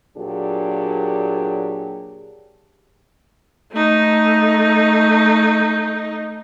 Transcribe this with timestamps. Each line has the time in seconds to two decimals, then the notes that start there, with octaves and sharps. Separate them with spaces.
0.18 A#2 F#3 D4 G4 G#4
3.72 A3 D#4